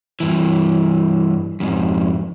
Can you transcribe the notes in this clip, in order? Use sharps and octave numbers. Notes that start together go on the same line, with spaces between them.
G2 E3
F2 G#2